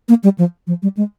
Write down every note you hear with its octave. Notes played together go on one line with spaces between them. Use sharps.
A#3
G3
F3
F3
G3
G#3